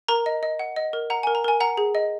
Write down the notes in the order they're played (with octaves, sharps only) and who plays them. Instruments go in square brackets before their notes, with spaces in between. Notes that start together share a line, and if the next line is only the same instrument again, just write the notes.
[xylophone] A#4 A#5
D#5
D#5
F#5
D#5
A#4
F#5 A#5
G#5
A#4
A#5
A#4 G#5
F#5 A#5
G#4
D#5